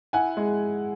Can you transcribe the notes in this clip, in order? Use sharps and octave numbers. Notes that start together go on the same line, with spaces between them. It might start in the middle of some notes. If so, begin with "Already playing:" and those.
E4 F#5 G#5
G#3